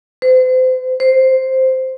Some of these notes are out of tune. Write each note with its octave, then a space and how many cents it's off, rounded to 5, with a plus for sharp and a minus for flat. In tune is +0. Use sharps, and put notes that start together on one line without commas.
C5 -35
C5 +0